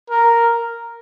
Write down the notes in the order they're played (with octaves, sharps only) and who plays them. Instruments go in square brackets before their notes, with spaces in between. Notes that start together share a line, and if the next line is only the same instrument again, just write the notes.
[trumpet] A#4